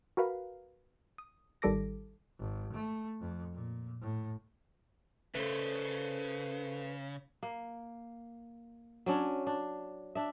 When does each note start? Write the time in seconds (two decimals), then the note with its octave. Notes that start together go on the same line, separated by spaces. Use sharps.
0.17 F#4 A#4 B4 F5
1.18 D#6
1.62 G#1 D#3 G3 A4 D6 A#6
2.39 G#1
2.73 A3
3.20 F2
3.54 A#2
4.01 A2
5.35 C#3 A3 B4 C5
7.43 A#3
9.06 F#3 C#4 D4
9.47 D4
10.15 D4 E5